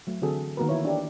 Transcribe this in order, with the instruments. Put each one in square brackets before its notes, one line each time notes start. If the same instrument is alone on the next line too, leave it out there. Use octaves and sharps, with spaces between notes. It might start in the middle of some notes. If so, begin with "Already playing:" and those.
[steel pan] F#3 A3
D3 E3 C4 F#4 G#4 A4
D#3 A#3 B3 F#4 A#4 B4
E3 E4 C#5
D4 G4